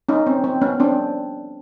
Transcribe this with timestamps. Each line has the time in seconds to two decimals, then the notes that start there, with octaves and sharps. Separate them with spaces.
0.09 C#4 D#4
0.27 C4
0.44 C4
0.62 B3 C#4
0.80 C4 D4